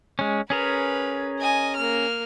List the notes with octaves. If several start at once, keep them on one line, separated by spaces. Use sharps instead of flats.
G#3 C#4
C#4 G#4 A#4 B4
D#5 G#5
A#3 F6